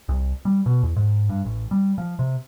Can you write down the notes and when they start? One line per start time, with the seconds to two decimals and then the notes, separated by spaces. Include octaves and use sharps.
0.09 C2
0.45 G3
0.66 B2
0.83 E2
0.96 G#2
1.29 G2
1.45 A1
1.71 G3
1.98 F3
2.19 C3